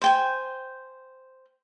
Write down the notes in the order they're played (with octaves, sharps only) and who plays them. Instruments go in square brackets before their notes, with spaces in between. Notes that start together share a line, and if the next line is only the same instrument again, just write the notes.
[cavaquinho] C5 G5 G#5